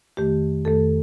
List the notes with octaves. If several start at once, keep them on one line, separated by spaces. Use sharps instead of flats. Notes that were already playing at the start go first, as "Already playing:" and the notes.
F2 D#3 A3 G4
F2 D#3 A3 A4